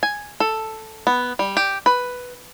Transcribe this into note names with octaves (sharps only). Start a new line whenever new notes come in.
G#5
A4
B3
G3
G4
B4